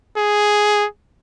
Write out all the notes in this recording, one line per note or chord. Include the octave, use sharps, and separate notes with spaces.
G#4